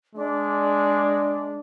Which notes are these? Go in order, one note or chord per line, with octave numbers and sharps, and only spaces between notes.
G#3 D4